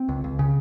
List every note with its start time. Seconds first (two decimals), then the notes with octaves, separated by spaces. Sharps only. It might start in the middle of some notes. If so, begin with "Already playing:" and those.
Already playing: C4
0.08 C#2
0.24 C#2
0.39 C#3